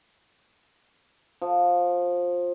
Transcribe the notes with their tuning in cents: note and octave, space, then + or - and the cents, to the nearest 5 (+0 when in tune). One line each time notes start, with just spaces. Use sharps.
F3 +15